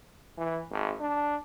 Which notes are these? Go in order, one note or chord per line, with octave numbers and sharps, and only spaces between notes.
E3
G#1
D4